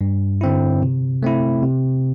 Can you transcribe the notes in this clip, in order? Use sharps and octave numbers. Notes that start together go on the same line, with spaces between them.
G2
D3 C4 E4
C3
A3 C4 E4
C3